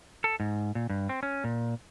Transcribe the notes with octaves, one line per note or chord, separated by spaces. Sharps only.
A4
G#2
A#2
G2
C4
C#4
A#2